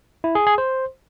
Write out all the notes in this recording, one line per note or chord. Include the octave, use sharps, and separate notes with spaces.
E4
G#4
G#4
C5